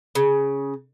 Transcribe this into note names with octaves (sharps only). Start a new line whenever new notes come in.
C#3